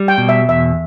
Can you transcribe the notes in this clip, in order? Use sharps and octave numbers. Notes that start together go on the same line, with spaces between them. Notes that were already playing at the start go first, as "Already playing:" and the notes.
Already playing: G3
G5
B2
E5
E2 E5